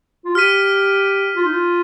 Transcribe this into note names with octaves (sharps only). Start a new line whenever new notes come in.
F4
G4 F6 B6 D#7
F4
D#4
F4